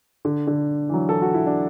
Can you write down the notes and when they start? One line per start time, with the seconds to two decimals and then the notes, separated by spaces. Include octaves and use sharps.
0.25 D3
0.47 D3
0.89 E3
0.94 F#3
1.09 A4
1.22 F#4
1.34 E4
1.47 D4